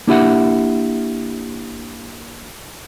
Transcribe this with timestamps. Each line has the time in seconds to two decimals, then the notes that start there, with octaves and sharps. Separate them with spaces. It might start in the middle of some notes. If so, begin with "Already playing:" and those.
0.07 A#3 D4 E4 G4 E5 F#5